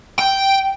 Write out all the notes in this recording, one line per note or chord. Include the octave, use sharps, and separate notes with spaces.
G5